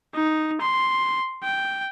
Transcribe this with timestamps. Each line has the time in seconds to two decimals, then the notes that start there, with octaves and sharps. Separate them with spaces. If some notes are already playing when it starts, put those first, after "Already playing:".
0.15 D#4
0.61 C6
1.44 G5